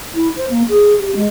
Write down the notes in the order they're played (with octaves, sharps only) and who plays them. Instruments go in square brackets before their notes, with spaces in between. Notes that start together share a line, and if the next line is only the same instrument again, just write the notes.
[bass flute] E4
C5
A#3
G#4
G4
G#3